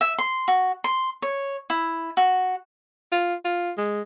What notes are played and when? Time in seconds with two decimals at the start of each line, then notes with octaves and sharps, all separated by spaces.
0.01 E5
0.19 C6
0.48 F#4
0.84 C6
1.22 C#5
1.70 E4
2.17 F#4
3.12 F4
3.44 F4
3.77 G#3